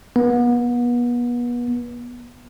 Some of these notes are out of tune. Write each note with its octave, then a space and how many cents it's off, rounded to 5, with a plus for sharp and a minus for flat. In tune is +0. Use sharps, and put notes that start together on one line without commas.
B3 -35